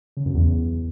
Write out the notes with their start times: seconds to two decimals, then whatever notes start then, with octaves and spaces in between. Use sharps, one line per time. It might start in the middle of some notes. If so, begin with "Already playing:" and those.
0.17 C#3
0.25 F#2
0.34 E2